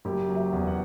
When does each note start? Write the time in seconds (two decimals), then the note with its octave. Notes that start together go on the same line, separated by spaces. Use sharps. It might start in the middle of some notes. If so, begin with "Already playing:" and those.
0.05 F#1 G4
0.29 F#3
0.36 E5
0.53 E2
0.67 F#5